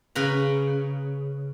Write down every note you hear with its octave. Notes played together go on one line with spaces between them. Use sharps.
C#3 B4 A#5